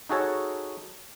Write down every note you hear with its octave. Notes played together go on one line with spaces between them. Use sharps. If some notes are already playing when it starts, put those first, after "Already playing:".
D#4 F#4 G#4 A4 C#5 D#5